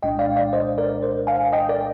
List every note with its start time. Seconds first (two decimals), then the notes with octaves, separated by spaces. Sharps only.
0.03 C2 A#2 G#3 D4 D#5 G5
0.19 D5 F5
0.37 D5 F5
0.53 C5 D#5
0.78 A#4 D5
1.03 C5
1.27 F5 G#5
1.53 D#5 G5
1.69 A#4 D5